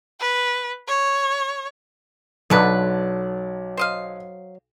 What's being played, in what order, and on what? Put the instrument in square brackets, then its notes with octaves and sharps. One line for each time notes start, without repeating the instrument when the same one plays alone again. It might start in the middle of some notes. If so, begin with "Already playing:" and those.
[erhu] B4
C#5
[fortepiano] B1 D5 [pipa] D3 A4 B4 [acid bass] F#3
[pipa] C5 D#5 F5